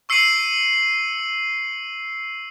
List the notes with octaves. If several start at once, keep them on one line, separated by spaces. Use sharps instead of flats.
C#6 E6 C7 C#7 D#7 F#7